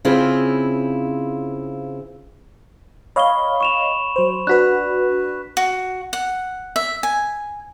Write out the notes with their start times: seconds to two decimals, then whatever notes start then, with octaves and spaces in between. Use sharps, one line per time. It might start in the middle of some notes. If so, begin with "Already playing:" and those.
0.05 C#3 C4 E4 F4 G#4
3.16 C#5 D#5 F5 B5 C#6 G7
3.61 C#6 E7 F7
4.16 F#3 C5
4.47 D4 F#4 B4 F#6 B6
5.57 F#4
6.13 F#5
6.76 E5
7.03 G#5